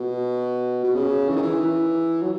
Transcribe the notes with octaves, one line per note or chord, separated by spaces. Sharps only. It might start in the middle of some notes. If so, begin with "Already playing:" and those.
Already playing: B2
B2
C#3
E3
D#3
E3
F#3